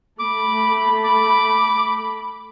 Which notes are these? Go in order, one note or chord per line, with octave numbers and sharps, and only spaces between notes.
A3 B5 D6
D6